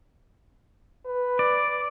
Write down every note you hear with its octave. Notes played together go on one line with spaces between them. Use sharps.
B4
D5